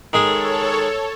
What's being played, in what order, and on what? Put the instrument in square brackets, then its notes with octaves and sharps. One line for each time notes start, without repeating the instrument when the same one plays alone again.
[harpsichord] D#3 G#3 G#4 [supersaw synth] A4 C#5